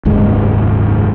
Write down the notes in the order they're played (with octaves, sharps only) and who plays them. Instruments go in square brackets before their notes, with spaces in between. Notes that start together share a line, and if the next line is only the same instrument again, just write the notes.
[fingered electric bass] F#1 D#2 G#2 G#3